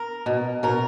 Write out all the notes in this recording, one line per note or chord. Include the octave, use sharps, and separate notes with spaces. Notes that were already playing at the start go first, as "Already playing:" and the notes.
Already playing: A#4
B2
B2 A#4